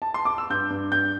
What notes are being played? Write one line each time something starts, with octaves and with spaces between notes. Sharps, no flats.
A5
C6
D6
E6
G2 G6
G2
G2 G6